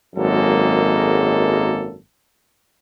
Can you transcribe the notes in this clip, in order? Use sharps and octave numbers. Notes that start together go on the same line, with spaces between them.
G#1 F#2 F#3 G#3 A#3 A4